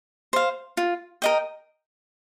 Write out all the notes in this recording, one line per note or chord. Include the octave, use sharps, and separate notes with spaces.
C5 F5
F4
A#4 D#5 G5